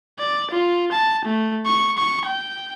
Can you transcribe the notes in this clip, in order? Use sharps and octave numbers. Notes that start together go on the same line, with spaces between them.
D5
F4
A5
A3
C#6
C#6
G5